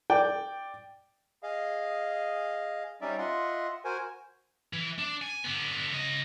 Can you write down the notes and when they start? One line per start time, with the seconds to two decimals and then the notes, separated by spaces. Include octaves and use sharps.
0.10 D5 G5
1.43 G#4 D#5 F5
3.01 G3 C#4 D#4 D5 E5
3.18 F4 D#5 E5 F#5 C6
3.85 F#4 A#4 C5 G#5
4.73 E3
4.98 D4
5.22 G#5
5.44 D3 B3
5.92 C#3 D#5